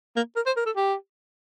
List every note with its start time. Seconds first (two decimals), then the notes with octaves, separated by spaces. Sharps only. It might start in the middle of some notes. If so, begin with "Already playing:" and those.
0.16 A#3
0.36 A#4
0.46 C5
0.57 A#4
0.66 A4
0.76 G4